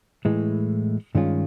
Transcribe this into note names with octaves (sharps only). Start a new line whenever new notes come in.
A2 E3 G#3
G2 D#3 G#3 C#4 F4